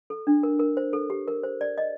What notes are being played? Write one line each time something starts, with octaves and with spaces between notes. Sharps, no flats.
A4
D4
A#4
A#4
C5
A4
G4
A#4
C5
D5
D#5